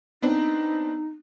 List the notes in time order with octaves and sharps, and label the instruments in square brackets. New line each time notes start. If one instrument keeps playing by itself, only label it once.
[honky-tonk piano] B3 C4 D4 [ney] D#4